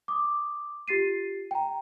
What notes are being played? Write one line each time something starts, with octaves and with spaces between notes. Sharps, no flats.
D6 D#6
F4 G4 A6 C7 D#7
G5 A#5